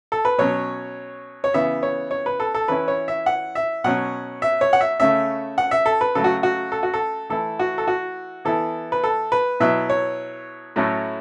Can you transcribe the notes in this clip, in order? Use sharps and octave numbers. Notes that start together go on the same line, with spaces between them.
A4
B4
B2 F#3 C#4 C#5
C#5
C#3 E3 B3 E5
C#5
C#5
B4
A4
A4
E3 C#4 E4 B4
C#5
E5
F#5
E5
B2 F#3 C#4 F#5
E5
C#5
F#5
E5
C#3 A3 C#4 E5
F#5
E5
A4
B4
C#3 F#3 A3 A4
F#4
F#4
A4
F#4
A4
E3 A3 E4 A4
F#4
A4
F#4
E3 B3 E4 A4
B4
A4
B4
B2 F#3 B3 E4 E5
C#5
A2 F#3 A3 C#4 E4